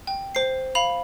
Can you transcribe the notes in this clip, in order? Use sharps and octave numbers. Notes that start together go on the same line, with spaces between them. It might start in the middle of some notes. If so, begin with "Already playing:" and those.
G5
C5 C7
F5 B5 F7